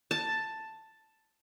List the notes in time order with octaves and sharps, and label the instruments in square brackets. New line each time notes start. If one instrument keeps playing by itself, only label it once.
[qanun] A5